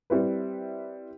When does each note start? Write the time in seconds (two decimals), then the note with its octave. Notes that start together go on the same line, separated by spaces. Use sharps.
0.10 G3 C4 E4 B4